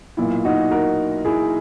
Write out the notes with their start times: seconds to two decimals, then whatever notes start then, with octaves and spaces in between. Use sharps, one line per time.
0.17 B1 A#2 E4
0.45 D#4 F#4
0.71 F#4 A#4
1.25 E4 G#4